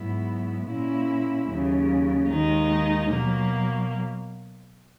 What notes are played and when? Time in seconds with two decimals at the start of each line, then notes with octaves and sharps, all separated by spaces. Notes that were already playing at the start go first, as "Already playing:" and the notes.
Already playing: G#2 F#3 B3 E4
0.65 A#2 A#3 C#4 E4
1.46 D#2 C#3 F#3
2.28 D#2 D#3 G#3 D#4
3.10 B2 F#3 A#3